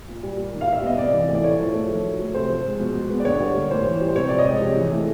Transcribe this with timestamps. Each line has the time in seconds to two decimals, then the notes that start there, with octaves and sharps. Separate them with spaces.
0.08 A#2
0.23 G3
0.38 A#3
0.53 D#3
0.61 F5
0.68 G3
0.73 E5
0.83 B3 D#5
0.98 C3 D5
1.13 E3
1.29 A3
1.35 D5
1.43 A2 C#5
1.59 F3
1.74 A3
1.89 D#3
2.04 F#3
2.19 A3
2.34 C3 C5
2.49 F3
2.65 G#3
2.79 B2
2.95 G#3
3.10 B3
3.20 D5
3.25 D3 C#5
3.40 G3
3.55 A#3
3.70 A2 C5
3.86 E3
4.01 G3
4.08 C5
4.16 C3 C#5
4.29 F3 D5
4.39 D#5
4.46 G#3
4.61 C3
4.76 E3
4.91 A3